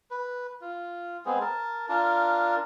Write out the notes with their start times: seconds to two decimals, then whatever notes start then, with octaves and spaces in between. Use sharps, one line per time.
0.11 B4
0.61 F4
1.25 G#3 B3 C4 G#4
1.41 A#4 A5
1.89 D4 F4 A#4 A5